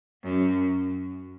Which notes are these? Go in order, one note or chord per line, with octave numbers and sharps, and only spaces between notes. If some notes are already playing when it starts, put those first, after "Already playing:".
F#2